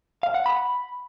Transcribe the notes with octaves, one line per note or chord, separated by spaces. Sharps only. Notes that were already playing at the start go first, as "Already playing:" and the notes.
F5
F#5
B5